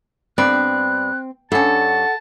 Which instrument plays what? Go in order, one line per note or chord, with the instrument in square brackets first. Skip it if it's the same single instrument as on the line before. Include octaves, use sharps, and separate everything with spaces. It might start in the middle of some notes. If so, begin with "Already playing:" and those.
[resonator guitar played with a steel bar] G2 B3 D5 [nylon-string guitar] C4 [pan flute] F#6
[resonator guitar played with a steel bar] G2 C#4 [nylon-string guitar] A4 [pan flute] F#5 [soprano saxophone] A5